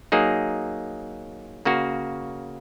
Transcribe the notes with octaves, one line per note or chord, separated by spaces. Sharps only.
F#3 A#3 D#4 G#4
C#3 A#3 F#4